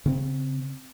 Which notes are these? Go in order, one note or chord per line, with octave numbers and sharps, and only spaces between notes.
C#3 C4